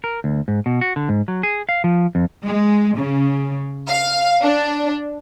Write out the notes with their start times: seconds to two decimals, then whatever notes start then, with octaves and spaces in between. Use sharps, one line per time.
0.04 A#4
0.24 D2
0.48 G#2
0.66 B2
0.81 F#4
0.96 D3
1.09 G#2
1.28 F#3
1.43 G#4
1.69 F5
1.84 F3
2.15 F2
2.43 G#3
2.96 C#3
3.89 F5
4.42 D4